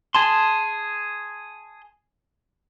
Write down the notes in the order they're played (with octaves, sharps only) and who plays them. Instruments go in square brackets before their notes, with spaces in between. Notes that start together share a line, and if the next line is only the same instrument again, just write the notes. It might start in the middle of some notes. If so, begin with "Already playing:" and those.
[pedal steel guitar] G#4 A5 C6